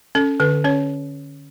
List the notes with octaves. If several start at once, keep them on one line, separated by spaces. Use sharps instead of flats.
C#4 A4
D3 B4
C#4 C#5